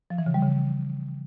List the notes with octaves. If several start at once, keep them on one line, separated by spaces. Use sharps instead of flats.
F3
E3
C#3
G3
C#3